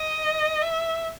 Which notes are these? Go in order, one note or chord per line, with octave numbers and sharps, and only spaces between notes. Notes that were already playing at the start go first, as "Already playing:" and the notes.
Already playing: D#5
E5